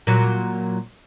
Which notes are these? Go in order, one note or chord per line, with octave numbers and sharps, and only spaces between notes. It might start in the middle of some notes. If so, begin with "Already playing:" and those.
A#2 F#3